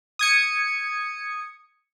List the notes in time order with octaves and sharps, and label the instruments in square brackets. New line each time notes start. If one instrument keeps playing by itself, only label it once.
[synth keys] D#6 G#6 C#7